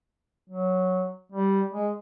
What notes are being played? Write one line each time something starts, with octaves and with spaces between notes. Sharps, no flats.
F#3
G3
G#3